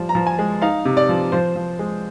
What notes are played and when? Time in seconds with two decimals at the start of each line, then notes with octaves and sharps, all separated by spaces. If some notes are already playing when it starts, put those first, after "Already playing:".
Already playing: F3 G3
0.09 A#5
0.15 F3
0.27 G#5
0.39 G#3
0.62 D#4 F5
0.85 C3
0.97 D5
1.09 F3
1.32 F3 C5
1.56 F3
1.79 G#3